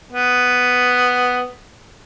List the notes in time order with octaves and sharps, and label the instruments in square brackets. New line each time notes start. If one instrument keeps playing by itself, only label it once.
[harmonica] B3